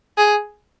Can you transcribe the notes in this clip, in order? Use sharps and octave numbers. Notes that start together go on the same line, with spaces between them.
G#4